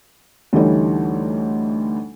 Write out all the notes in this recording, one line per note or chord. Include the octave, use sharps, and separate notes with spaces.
D2 E3 G3 A3 D#4 C#5